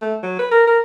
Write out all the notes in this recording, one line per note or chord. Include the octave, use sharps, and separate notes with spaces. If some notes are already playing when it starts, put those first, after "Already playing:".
A3
F#3
B4
A#4
A#4